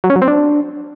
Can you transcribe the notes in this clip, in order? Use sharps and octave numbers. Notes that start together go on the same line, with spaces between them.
F#3
C#4
F#3
C4
D4